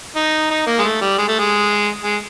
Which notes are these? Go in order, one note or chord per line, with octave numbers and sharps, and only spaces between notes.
D#4
D#4
A#3
G#3
A3
G3
G#3
A3
G#3
G#3